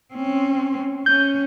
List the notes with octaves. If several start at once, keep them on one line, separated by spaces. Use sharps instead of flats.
C4 C#4
C#4 G6